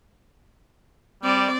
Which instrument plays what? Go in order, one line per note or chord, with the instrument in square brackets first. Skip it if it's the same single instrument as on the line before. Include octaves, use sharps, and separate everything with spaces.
[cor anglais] G3 [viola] C4 D5